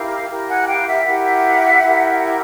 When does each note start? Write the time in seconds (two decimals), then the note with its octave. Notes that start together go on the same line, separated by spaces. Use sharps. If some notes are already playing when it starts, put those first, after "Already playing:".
Already playing: E4 G4 A#4 F5
0.30 E4 G4 A#4
0.48 F#5 G#5
0.61 G#5
0.67 F5 G5
0.87 E5 F#5
1.06 E4 G4 A#4 E5 F#5
1.83 E4 G4 A#4